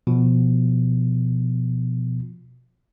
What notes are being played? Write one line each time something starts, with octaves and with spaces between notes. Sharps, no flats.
B2 F3